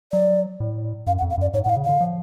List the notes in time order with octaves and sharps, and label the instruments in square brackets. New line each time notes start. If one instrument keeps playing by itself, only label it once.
[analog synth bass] F#3 [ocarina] D5
[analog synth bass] A2
[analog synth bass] F#2 [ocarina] F5
[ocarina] F#5
[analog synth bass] F2
[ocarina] F5
[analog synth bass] F#2 [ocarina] D5
[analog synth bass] G#2 [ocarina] C#5
[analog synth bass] A2 [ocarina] F#5
[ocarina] F5
[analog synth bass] C#3
[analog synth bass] D3 [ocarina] F5
[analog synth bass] F3